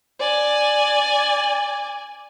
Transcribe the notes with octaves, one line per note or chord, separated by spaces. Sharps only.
D5 G#5